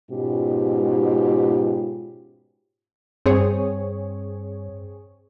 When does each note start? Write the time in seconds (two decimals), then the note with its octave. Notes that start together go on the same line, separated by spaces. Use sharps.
0.11 G#2 B2 C#4 F4 G4
3.26 G2 C4 G#4 C#5